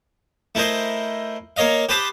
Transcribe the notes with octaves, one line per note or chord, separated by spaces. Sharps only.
A3 E4 A#4 C5 D#5
A#3 A#4 C#5 D#5 F5
G4 B4 C5 A5 D6 D#6